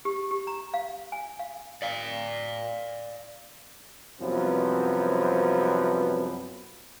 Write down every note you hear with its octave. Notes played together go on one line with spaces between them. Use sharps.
G4
G4
A#5
F5
G#5
F5
D5 F5
C2 F#2 F3 B3 C4 B4